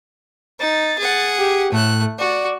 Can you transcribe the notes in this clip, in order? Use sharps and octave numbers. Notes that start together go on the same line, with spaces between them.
D#4 A6
G#4 F#5
G4
A2 A3 F#6
F#4 D5